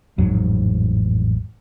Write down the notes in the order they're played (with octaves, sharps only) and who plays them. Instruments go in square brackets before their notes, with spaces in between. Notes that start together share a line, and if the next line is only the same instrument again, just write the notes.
[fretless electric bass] A1 F2 G#2 F#3